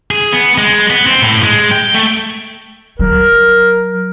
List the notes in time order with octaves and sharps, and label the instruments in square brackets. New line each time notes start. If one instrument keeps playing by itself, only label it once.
[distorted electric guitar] G#4
B3
G#3
B3
C4
A2
G#3
G5
A3
[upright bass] F#3 [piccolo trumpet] A#4